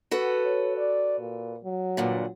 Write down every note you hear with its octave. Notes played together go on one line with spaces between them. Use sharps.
F#4 A4 B4
C#5
D5
A#2
F#3
G2 A#2 D3